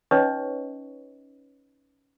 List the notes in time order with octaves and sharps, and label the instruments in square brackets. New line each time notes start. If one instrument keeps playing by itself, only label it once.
[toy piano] C#4 D#4 B4 C#5 D#5 C#6